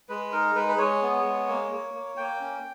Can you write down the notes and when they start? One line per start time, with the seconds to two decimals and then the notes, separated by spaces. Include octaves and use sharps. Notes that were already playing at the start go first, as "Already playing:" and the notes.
0.09 G#3 B4
0.32 D#4 A#4
0.55 G#3 B4
0.69 B4
0.78 G#3 C#5
1.02 B3
1.24 G#3
1.48 A#3
1.71 A#3
1.94 A#3
2.17 A#3 G5
2.41 C#4